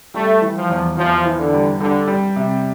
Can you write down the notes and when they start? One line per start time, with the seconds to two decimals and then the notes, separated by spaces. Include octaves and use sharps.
0.14 G3 A3
0.41 E3
0.56 F3
0.69 E2
0.97 E2 F3
1.25 E3
1.38 D3
1.53 G3
1.80 D3 G3
2.07 G3
2.36 C3